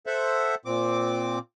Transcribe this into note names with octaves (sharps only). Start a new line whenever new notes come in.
A4 C5 E5 F#5
A#2 C4 D6